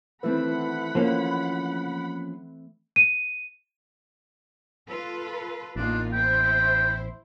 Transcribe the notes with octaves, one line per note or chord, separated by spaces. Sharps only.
D#3 E3 A3 C4 E4 B4 F#5 B5
F3 A#3 C#4
D#7
F4 A4 B4
A1 E2 A#3 D4 D#4 F4
E4 C5 G5